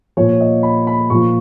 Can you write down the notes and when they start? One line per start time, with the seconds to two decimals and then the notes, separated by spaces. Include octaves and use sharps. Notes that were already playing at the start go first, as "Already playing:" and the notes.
0.17 A#2 F3 C#5
0.40 D#5
0.63 B5
0.87 B5
1.10 A#2 F3 C#6